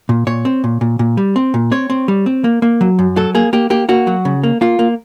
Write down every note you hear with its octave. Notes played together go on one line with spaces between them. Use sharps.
A#2
A#2 C#5
C4
A#2
A#2
A#2
G3
C4
A#2
C4 C#5
C4
G3
C4
A#3
A#3
F#3
F#2
F#3 A4
A#3 G#4
A#3 G4
A#3 G4
A#3 F#4
F#3
C#3
A#3
A#3 F4
A#3